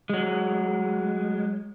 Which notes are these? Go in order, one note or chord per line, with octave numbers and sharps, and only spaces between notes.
F#3 G#3